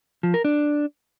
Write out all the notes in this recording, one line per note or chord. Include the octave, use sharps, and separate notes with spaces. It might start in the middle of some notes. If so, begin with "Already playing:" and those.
F3
A#4
D4